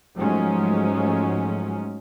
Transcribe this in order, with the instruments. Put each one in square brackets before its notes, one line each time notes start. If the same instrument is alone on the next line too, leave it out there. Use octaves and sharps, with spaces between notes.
[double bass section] G#2 F3 F#3 G#3 A3 C#4